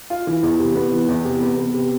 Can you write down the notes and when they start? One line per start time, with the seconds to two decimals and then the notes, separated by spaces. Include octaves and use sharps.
0.10 F4
0.27 E3
0.43 E2
0.59 C3
0.76 B3
0.92 E3
1.09 E2
1.25 C3
1.41 B3
1.58 B3
1.74 C3